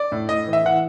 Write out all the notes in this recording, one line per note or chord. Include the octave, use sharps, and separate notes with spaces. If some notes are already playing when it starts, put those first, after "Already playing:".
Already playing: D5
A2
A2 D#5
E3
E5
E3 F#5